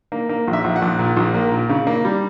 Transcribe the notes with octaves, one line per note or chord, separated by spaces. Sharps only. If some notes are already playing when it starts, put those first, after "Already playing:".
A#3
A#3
A#1
E5
A#1
F#5
A#1
A#2
A#1
A#3
A#2
C#3
A#3
G3